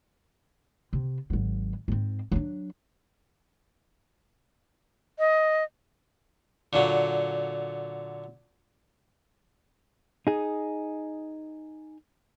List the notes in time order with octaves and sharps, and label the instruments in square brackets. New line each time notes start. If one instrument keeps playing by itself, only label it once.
[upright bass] C3
G#1 F#3
G#2 C4
F#3 D4
[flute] D#5
[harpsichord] A#2 D3 F#3
[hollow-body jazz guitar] D#4 G#4